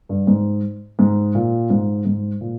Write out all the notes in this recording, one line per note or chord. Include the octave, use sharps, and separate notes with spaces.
G2
G#2
G#2
A#2
G#2
G#2
A#2